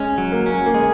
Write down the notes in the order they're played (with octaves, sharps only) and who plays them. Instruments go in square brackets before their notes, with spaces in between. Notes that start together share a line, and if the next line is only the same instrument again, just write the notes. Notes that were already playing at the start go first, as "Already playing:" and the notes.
Already playing: [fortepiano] G#3 [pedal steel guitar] C#4
[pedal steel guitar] F#3
[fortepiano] A#3
[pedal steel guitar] C#4
[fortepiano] A#3
[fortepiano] G#3 [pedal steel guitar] G#4